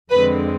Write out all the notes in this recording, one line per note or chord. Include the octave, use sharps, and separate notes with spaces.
F2 D3 G#3 C4 B4